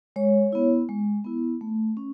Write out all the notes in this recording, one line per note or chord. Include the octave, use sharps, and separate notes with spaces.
G#3 C#5
B3 E4
G#3
B3 E4
A3
C#4